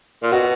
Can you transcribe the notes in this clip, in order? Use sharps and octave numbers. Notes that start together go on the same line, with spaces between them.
A#2
B2 F#4